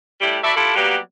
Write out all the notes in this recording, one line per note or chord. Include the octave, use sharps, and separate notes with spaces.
A2 G3 E4 G4
E4 F#4 A4 D5 E5
D4 E4 F4 G4 A4
F#3 G3 A#3 B3 F#4 G4